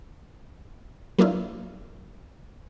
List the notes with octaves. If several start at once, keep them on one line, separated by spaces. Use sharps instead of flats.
F#3 A#3 D4 E4 F4